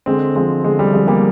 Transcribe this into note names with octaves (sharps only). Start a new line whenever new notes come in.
D3 G#3 C4
F3 G#3 C4
D3 G#3
G3
F3 G#3
G3 A#3